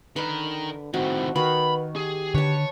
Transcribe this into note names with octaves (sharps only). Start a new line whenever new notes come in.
D3 D#3 A#4 B4 B5
A2 D#3 C4 F#4
D#3 F#4 B4 F5 B5
G4 G#4
D3 B4 C#5 A5